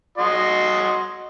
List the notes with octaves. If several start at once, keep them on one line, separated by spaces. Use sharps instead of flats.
F#4 D#5 C6